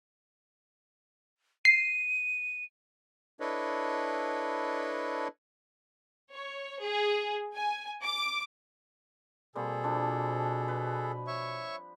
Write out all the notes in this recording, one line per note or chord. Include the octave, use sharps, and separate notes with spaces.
C7 D#7
D4 E4 A4 B4 C#5 D#5
C#5
G#4
G#5
D6
B2 G3 A#3 C4 G#4 A4
F3 D4
B4
C#5 E5 C#6